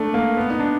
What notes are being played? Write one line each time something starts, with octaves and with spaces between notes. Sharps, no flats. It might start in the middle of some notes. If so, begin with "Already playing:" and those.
Already playing: A3 D4
A#3
B3
D#4
D4